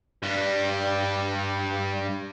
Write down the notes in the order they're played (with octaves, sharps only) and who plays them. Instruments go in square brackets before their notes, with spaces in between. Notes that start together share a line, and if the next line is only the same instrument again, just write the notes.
[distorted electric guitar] G2 G3